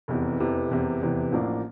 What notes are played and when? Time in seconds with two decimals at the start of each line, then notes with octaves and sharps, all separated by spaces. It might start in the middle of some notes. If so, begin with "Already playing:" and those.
0.08 F1 E2 C3 E3
0.39 F1 E2 C3 E3
0.70 F1 E2 C3 E3
1.01 F1 E2 C3 E3
1.32 A1 A2 F3 A#3 D4